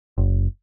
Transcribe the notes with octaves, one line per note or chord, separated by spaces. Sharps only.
F#1